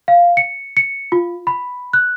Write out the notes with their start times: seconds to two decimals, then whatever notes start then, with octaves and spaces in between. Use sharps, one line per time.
0.08 F5
0.37 C#7
0.77 C#7
1.12 F4
1.47 B5
1.93 F#6